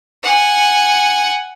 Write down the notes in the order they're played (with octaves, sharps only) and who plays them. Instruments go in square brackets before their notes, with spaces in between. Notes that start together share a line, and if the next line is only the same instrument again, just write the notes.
[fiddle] F#5 G#5